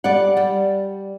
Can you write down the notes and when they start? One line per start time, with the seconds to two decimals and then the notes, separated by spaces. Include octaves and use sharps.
0.04 G3 D5 F#5
0.37 G3